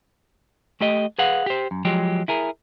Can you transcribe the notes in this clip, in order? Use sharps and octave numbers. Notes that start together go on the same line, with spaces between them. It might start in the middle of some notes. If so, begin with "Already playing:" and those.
A3 G4 D#5
G#4 B4 F5 F#5
G4 C5
F#2
F3 F#3 G#3 G4
E4 G#4 A#4